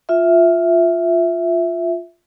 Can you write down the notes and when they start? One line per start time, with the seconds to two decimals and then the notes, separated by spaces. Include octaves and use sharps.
0.09 F4 E5